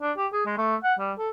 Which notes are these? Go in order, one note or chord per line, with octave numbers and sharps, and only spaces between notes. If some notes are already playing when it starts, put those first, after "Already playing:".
D4
G4
G#4
G#3
A3
F#5
G3
A4